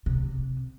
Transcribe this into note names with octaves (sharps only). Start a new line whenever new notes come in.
C3